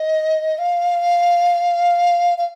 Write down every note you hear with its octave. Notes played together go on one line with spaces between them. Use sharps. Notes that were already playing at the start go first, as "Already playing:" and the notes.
Already playing: D#5
F5
F5